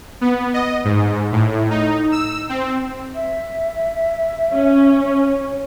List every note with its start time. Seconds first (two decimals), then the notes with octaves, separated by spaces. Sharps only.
0.21 B3
0.54 D#5
0.85 G#2
1.32 A2
1.70 D#4
2.12 E6
2.49 C4
3.15 E5
4.54 C#4